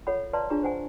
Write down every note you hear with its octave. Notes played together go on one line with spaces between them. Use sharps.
F4 A4 C#5 F#5 B5
B4 D5 F5 A5 A#5 C6
D4 F4 G#4 A#5 C#6
C5 F#5 G#5